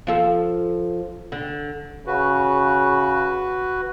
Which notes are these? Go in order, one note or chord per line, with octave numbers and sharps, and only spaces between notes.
F3 F4 A4
D3
C#3 F#4 B4